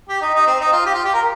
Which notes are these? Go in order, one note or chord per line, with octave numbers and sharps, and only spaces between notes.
G4
D#4
D#4
C4
D#4
F4
G4
F4
G4
A#4